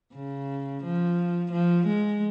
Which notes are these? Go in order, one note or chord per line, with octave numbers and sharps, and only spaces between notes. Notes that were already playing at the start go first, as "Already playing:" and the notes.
C#3
F3
F3
G#3